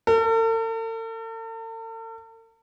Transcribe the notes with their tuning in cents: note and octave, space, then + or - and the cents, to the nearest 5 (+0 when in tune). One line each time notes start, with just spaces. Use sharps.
A4 +45